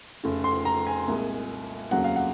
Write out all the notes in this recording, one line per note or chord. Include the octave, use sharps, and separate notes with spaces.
F1 F2 C#3
C6
A#5
G#5
C2 A#2 G#3
F1 D#2 C#3 F#3 F#5
F5
F#5